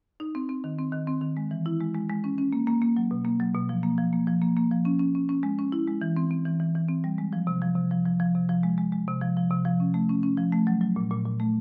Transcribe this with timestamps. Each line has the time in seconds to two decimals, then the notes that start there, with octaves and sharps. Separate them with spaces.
0.20 D#4
0.35 C4
0.49 C4
0.64 D#3
0.78 C4
0.92 D#3
1.07 C4
1.21 D#3
1.37 G#3
1.51 E3
1.66 E4
1.80 G#3
1.95 G#3
2.09 G#3
2.24 C#4
2.38 C#4
2.53 A#3
2.67 A#3
2.82 A#3
2.97 F#3
3.11 B2
3.25 A#3
3.40 F#3
3.55 B2
3.69 F3
3.83 A#3
3.98 F3
4.13 A#3
4.27 F3
4.42 A#3
4.57 A#3
4.71 F3
4.85 C#4
4.99 C#4
5.15 C#4
5.29 C#4
5.43 G#3
5.59 C#4
5.72 E4
5.87 G#3
6.01 E3
6.17 C4
6.31 C4
6.45 E3
6.60 E3
6.75 E3
6.88 C4
7.04 G3
7.18 G#3
7.33 F3
7.47 C3
7.62 F3
7.76 C3
7.91 F3
8.06 F3
8.20 F3
8.35 C3
8.49 F3
8.63 G#3
8.78 G#3
8.92 G#3
9.08 C3
9.21 F3
9.37 F3
9.51 C3
9.65 F3
9.80 C#4
9.94 A3
10.09 C#4
10.23 C#4
10.37 F3
10.52 A3
10.67 F#3
10.81 F#3
10.96 A#2
11.11 A#2
11.25 A#2
11.40 A3